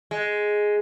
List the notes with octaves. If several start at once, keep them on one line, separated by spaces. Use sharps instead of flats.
G#3